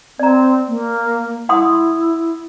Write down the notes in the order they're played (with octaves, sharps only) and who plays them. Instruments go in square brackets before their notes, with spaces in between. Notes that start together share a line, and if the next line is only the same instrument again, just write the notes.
[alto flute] C4 [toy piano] D5 A#5
[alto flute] A#3
[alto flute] E4 [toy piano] F#5 C6 D#6